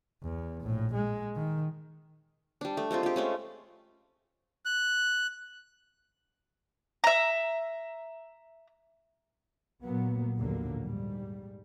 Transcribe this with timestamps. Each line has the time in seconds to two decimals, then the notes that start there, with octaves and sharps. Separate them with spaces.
0.23 E2
0.61 A#1 A2
0.94 G#3
1.36 D#3
2.61 G3 D4
2.77 A3
2.91 G3 G#3 C4 F4
3.03 F4 G4
3.16 G#3 A3 C#4
4.65 F#6
7.04 E5 A#5
9.82 A#2 F#3 A#3 B3
10.37 A#1 D#2 A2 D3 F#3 A#3
10.82 G#2 G3